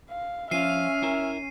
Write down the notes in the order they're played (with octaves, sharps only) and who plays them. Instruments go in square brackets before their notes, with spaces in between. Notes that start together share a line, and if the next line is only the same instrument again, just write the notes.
[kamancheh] F5
[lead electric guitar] F3 F4 [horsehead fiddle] C#4 [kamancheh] E5 F6 [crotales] C7 D#7
[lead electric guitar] E4 A#4